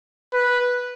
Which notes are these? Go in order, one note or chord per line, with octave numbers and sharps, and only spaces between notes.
B4